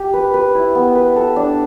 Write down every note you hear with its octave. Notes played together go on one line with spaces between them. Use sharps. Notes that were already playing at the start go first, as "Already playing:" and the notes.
Already playing: G4
B4
B4
E4
B3
B4
A4
D4